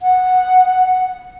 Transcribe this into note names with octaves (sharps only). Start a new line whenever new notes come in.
F#5